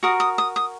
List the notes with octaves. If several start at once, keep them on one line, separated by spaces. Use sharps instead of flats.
F#4 A#4 D#6
D#6
D#6
D#6